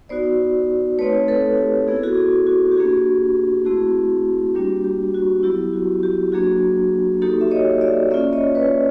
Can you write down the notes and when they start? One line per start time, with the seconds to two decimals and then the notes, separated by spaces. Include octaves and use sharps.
0.09 B3 D#4 F#4 C5 D5
0.99 A3 C4 D#4 B4 C#5
1.28 A4 B4
1.58 G4
1.88 B3 E4 G#4
1.96 A4
2.03 F#4 G#4
2.18 F#4
2.47 F#4
2.71 G4
2.76 A#3 D4 F#4 G#4
3.65 A3 C4 E4 F#4 G#4
4.55 G3 A#3 D4 F#4 G4
4.84 G4
5.14 F#4
5.43 F#3 B3 E4 G4
5.73 F#4
6.03 G4
6.32 F#3 A#3 D4 F#4 G#4
7.22 A#3 D#4 F#4 G4 A4
7.41 E5
7.51 C#5 D#5
7.81 D5 E5
8.11 A#3 C#4 F4 D5 E5
8.33 C#5 D#5
8.55 B4 C#5